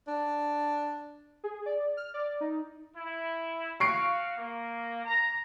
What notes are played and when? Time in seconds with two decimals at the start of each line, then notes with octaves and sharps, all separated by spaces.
0.07 D4
1.44 G#4
1.66 D5
1.97 F6
2.14 D5
2.41 D#4
2.97 E4
3.80 F#4 F5 C#6 C7 D7
4.38 A#3
5.04 A#5